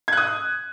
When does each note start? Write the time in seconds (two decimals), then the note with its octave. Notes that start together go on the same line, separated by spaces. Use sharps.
0.08 G#6
0.13 F#6
0.17 D#6